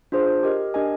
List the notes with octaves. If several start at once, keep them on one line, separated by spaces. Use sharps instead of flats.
D4 F4 G#4 C5
G4 A#4 D#5
D4 G4 A#4 D#5 G#5